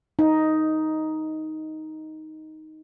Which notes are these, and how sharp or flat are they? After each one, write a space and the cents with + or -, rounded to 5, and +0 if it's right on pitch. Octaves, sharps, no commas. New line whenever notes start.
D#4 +5